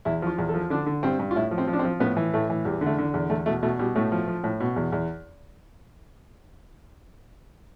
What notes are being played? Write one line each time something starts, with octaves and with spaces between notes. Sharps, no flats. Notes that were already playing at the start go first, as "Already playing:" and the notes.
E2 E4
F3 F4
E2
A4
F3
D3 D4
D3
G2 C4
G2
F4
A2 E4
F3
C4
F3
D4
C4
F3
A2 B3
E3
A2 A3
E3
E2 G3
D3
A3
D3
E2
E2 A3
B2 A3
B2 A3
B2 G3
A2 A3
F3
F3
A2
B2
E2
E2